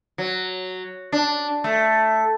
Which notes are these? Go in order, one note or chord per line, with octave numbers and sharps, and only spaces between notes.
F#3
D4
A3